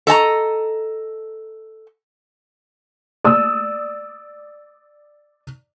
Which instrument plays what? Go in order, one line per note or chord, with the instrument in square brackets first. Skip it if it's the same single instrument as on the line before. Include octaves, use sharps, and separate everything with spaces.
[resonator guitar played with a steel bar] A4 D#5 A5 A#5
[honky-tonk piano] D5 D#6 E6